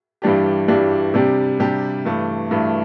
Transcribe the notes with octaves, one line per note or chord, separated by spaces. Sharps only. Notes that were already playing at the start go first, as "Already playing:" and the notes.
G2 E3 G3 D4 G4
G2 E3 G3 D4 G4
C3 G3 D4 G4
C3 G3 D4 G4
G2 E3 A3
G2 E3 A3